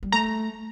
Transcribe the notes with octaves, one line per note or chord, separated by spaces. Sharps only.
G3
A3 A#5